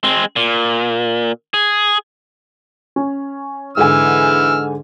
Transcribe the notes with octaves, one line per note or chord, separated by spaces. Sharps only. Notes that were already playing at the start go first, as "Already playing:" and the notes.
G#3 C4
A#2
G#4
C#4
G#2 D3 E3 G#5 E6 F6